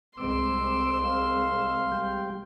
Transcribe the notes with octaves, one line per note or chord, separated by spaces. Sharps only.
C2 G#3 C4 C6 D6 E6
F5 E6
G3 G5